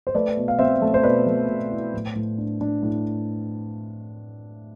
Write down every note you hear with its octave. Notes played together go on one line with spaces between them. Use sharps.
C5
A3 B4 D5
B2
F5
C4 C5 E5
A3
C5
B2 B4 D5
A3
B2
E4
A2
A2
D4
D4
A2